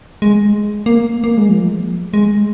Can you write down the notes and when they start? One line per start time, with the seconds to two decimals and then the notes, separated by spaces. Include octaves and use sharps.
0.22 G#3
0.86 A#3
1.24 A#3
1.37 G#3
1.49 F3
2.14 G#3